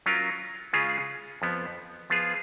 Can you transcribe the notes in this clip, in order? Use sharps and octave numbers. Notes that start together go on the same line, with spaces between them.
F#3 C#4 F4 A#4
C#3 G#3 C#4 F4 G#4
F2 F3 B3
F3 B3 F4 G#4